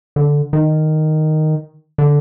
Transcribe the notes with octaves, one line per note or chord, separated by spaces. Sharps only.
D3
D#3
D3